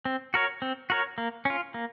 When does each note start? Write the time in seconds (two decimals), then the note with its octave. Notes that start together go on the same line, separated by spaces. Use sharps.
0.05 C4
0.34 F#4 A#4 C#5
0.62 C4
0.90 F#4 A#4 C#5
1.18 A#3
1.45 C#4 F4
1.74 A#3